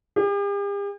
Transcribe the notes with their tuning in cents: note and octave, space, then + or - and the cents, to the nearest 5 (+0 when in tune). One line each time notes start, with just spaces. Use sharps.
G4 +45